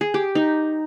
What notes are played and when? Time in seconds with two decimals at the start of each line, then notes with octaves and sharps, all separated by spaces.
0.01 G#4
0.14 G4
0.35 D#4